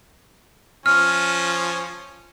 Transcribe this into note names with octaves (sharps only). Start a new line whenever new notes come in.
F3 C#4 F6